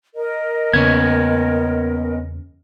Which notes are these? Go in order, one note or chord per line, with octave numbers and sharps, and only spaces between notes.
A#4 D#5
E2 C#3 A#3 B3 C#4 G#6